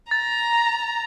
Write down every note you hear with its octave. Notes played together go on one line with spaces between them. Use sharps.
A#5 A6